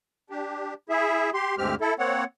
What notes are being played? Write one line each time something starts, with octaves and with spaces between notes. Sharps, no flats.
D4 G4
E4 G#4 E5
G4 C6
D2 G2 G#3 C4 G4 F6
E4 A4
A#3 C4 C#5 F#5